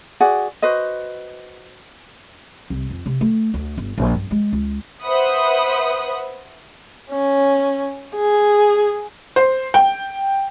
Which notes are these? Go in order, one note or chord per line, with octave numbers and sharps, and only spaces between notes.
F#4 G#4 D5 F#5
F#4 B4 C5 D#5
C2
F2
C3
A3
D2
G1
A#1
G2
G#3
C#2
B4 C5 E5 F#5 B5 D#6
C#4
G#4
C5
G5